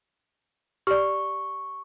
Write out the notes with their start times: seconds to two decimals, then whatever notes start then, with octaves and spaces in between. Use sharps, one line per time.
0.87 G4 D5 C#6